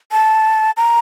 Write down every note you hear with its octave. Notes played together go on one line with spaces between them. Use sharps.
A5
A#5